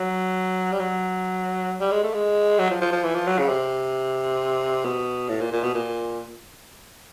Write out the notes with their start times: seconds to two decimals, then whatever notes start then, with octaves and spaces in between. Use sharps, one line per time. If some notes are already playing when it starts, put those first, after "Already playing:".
Already playing: F#3
0.72 G3
0.80 F#3
1.81 G3
1.92 G#3
2.04 A3
2.14 G#3
2.59 F#3
2.71 F3
2.81 F3
2.92 F3
3.04 E3
3.15 F3
3.27 F#3
3.39 C#3
3.49 C3
4.85 B2
5.29 A2
5.41 A#2
5.52 A#2
5.63 B2
5.75 A#2